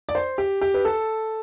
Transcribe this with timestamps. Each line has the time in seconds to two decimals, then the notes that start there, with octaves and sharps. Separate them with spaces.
0.09 D5
0.15 C5
0.38 G4
0.61 G4
0.74 B4
0.85 A4